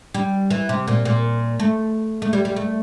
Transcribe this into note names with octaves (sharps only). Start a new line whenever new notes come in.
G3
E3
C3
A#2
A#2
A3
A3
G3
G3
A3